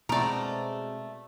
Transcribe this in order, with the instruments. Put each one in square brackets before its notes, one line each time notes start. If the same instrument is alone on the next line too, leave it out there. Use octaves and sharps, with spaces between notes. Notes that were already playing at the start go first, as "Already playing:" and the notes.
[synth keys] B2 G#3 C4 [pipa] A3 A#5 [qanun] A#4 D5